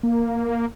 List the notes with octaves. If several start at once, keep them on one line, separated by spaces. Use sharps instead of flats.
A#3